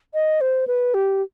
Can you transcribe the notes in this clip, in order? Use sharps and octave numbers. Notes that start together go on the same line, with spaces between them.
D#5
C5
B4
G4